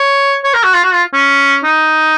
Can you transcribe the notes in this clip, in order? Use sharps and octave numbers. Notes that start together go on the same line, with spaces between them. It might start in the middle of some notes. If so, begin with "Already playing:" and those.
Already playing: C#5
C#5
A#4
F#4
F4
F#4
F4
C#4
D#4